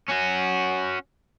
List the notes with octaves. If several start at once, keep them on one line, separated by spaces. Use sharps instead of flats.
C#4 F#4